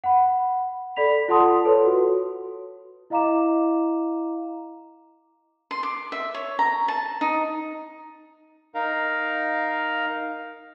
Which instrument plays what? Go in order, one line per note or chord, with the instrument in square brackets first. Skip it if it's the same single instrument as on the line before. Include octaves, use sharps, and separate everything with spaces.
[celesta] F#5 B5
A4 D5 B5 B6 F7
F4 A4 F#5 A5 C6 D#6
A4 B4 C#5
F#4
E4 D#5 F5 A#5 D6 E7
[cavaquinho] C6
D6
E5
C#5
A#5
A5
D#4
[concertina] D#4 A#4 F5